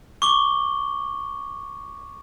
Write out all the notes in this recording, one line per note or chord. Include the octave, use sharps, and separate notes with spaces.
C#6 D6 G7